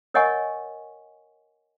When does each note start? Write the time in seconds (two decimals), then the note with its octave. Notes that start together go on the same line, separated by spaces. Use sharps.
0.14 A#4 C#5 D#5 F#5 G#5 C#6